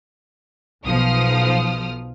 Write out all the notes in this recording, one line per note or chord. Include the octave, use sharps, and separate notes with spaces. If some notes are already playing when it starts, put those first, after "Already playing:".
B1 F3 D#6 F6